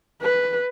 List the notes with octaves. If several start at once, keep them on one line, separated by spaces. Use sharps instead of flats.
B4